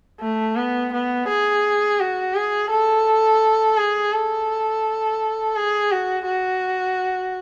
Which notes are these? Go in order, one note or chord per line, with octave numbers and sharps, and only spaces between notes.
A3
B3
B3
G#4
F#4
G#4
A4
G#4
A4
G#4
F#4
F#4